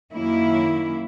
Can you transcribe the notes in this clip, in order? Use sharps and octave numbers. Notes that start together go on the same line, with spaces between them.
F#2 D#3 F#3 A#3 C#4 E4